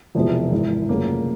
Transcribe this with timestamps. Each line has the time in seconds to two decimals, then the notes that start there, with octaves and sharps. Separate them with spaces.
0.15 E1 E2 C3 F3 G#3
0.51 G#1 G#2 E3
0.89 F1 F2 C#3 F#3 A#3